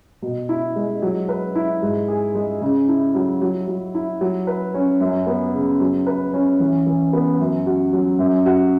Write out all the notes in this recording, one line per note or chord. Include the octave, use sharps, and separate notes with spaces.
B2
E4
G#3
F#3
B4
E4
G#2
G#4
G#3
C#3
E4
F#3
F#3
F#3
E4
F#3
B4
C#4
F#2
B3
C#3
F#3
B4
C#4
E3
E3
B3
F#2
F#4
F#3
F#2
F#4